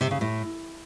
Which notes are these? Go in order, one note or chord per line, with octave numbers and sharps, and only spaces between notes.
C3
C#3
A2